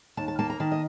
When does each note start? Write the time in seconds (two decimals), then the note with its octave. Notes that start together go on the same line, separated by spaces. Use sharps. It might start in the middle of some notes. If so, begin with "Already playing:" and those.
0.17 D#2 A5
0.28 A5
0.39 A#3 A5
0.50 A#5
0.60 D#3 A5
0.72 D#5